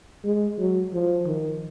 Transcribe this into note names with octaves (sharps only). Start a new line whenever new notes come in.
G#3
F#3
F3
D#3